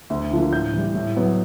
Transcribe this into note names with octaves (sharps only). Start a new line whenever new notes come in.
D2
D3 F3 A#3
A2 G6
E3 G3
A2
F#3 B3